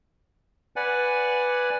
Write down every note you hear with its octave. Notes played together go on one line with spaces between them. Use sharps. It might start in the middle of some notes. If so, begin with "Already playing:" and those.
B4 D5 F#5 G#5